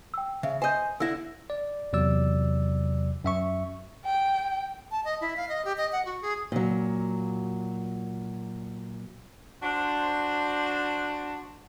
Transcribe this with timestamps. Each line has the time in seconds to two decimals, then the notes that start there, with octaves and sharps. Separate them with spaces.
0.14 G5 E6
0.43 C#3 E5
0.62 C5 D#5 G#5 G6
1.00 D3 E4 E6 A#6
1.50 D5
1.93 E2 C3 F#3 D5 E6
3.24 F#2 E5 C#6
4.06 G5
4.91 A5
5.05 D#5
5.21 E4
5.37 F5
5.49 D#5
5.65 G4
5.78 D#5
5.92 F#5
6.05 F#4
6.22 G#4
6.52 A#2 F#3
9.63 D4 F#4 C5